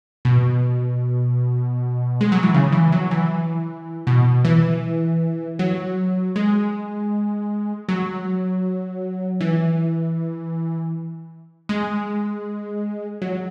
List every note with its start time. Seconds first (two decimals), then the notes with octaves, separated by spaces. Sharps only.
0.25 B2
2.21 G#3
2.32 F#3
2.43 E3
2.54 C#3
2.73 E3
2.92 F#3
3.11 E3
4.07 B2
4.45 E3
5.59 F#3
6.36 G#3
7.89 F#3
9.41 E3
11.69 G#3
13.22 F#3